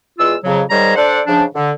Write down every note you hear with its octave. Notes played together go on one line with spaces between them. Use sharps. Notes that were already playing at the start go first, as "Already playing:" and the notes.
E2 G#3 F4 E6
F2 C#3 F#3
G#2 D#3 G3 C5 C#5 A#5
D4 A4 C5 D5 F#5
G#2 C#3 F3 D4
D3